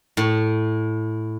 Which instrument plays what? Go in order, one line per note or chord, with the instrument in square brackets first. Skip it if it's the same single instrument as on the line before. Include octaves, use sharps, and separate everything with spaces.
[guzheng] A2